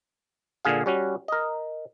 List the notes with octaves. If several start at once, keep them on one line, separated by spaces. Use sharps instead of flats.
A#2 D3 G#4 F5
G3 C#4 F#4
A#4 D#5